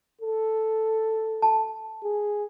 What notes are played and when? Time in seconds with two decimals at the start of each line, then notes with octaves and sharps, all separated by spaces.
0.21 A4
1.42 A5
2.04 G#4